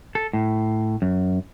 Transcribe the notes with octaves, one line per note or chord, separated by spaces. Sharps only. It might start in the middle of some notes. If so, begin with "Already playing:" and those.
A4
A2
F#2